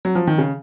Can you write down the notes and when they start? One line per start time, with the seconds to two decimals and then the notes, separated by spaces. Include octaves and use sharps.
0.05 F#3
0.15 F3
0.27 D#3
0.38 C#3